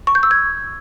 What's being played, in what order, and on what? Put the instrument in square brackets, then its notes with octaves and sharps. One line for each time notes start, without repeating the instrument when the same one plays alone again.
[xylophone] C#6
G6
E6
G#6